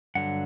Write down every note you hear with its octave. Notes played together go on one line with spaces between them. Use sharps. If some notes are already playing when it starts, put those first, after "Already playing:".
G2 D3 F#3 F#5